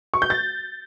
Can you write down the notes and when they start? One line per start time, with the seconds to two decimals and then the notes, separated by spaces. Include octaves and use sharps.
0.14 C#6
0.22 G6
0.30 A6